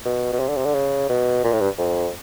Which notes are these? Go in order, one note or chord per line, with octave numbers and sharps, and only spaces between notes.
B2
B2
C3
D3
C3
D3
C#3
B2
A#2
A2
G2
F2